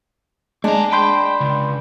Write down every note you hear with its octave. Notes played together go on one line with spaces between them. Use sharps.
G#3 A3 D4 A#5
G5 B5 C6 G6
C#2